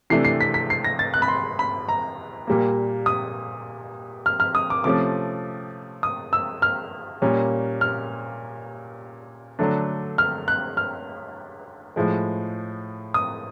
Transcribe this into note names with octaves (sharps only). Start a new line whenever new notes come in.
C3 E3 A3 D4 C7
C7
B6
B6
C7
A#6
A6
F#6
B5
C6
B5
A#5
A#2 G3 A#3
D#6
F6
F6
D#6
D6
C3 F3 A3 C#4 D6
D#6
E6
F6
A#2 G3 A#3 C#4
F6
D3 F#3 A3 D4
F6
F#6
F6
A2 F3 G#3
D#6